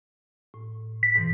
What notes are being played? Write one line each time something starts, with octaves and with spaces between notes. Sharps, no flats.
A2
B6
G#2 B2 E3